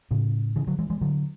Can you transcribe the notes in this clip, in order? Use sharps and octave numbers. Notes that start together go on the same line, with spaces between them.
A2 C#3
C#3 E3
D3 F#3
E3 G#3
E3 G#3
D3 F#3